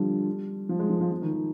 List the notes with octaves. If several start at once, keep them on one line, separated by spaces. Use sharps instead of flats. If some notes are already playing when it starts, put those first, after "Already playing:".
Already playing: D3 F3 G3
F3
G#3
F3
F3
F3
D#3
D#3